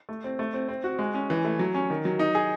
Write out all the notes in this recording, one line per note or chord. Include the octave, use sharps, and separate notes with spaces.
A3
C4
A3
C4
C4
F#4
G#3
C#4
E3
A3
F#3
C#4
D#3
F#3
D#4
G#4